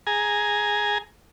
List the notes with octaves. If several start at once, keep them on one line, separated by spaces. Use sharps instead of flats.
G#4 G#5 A#5